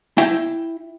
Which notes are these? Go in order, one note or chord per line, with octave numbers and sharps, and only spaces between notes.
E4 G5